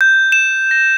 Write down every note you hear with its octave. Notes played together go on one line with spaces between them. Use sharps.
G6
E7
A#6